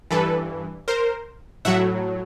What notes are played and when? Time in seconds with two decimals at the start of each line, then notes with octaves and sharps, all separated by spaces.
0.11 G2 E3 A4 B4
0.88 A#4 C5
1.65 A2 F#3 E5 F#5